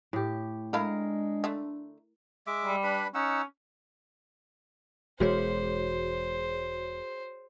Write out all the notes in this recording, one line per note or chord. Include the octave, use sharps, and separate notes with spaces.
A2 G4
G#3 A3 D4 E4 A#4 F5
D3 A3
G#3 E5 D6
G3
D4 B4 B5
C#4 D#4 F#5 E6
E1 E2 G#3 F#4 G#4 C5 C#5